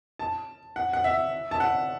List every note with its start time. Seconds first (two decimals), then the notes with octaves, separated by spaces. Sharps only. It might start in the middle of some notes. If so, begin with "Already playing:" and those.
0.19 A5
0.76 F#5
0.93 F#5
1.04 E5
1.51 A5
1.60 F#5